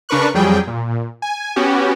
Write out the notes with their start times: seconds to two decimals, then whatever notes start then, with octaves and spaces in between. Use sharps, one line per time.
0.09 C#3 D4 A#4 B4 C#6 F#6
0.34 F2 F#3 G3 G#4 G5
0.67 A#2
1.22 G#5
1.56 B3 C#4 F#4 G4